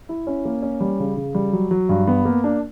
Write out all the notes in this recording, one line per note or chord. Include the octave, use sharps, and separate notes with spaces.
E4
C#4
A#3
C#4
G3
C#3
C#3
G3
F#3
F#3
G2
B3
A#3
D4